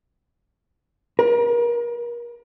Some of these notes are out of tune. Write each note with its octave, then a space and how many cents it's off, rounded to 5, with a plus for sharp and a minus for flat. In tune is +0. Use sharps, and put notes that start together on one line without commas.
A#4 +35